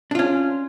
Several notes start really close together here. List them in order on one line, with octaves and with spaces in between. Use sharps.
D4 F4 C#4